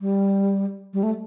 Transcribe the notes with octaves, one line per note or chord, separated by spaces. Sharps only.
G3
G3
A3